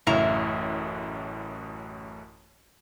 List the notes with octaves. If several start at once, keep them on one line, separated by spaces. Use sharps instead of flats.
A1 F#2 A2 C#3 E4 A#5